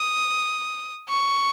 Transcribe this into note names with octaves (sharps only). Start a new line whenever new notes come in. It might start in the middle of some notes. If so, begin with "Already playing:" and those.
Already playing: D#6
C#6